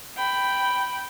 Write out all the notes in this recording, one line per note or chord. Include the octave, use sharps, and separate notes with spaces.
G5 B5